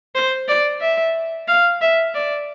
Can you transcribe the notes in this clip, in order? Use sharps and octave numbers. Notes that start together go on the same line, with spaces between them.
C5
D5
E5
F5
E5
D5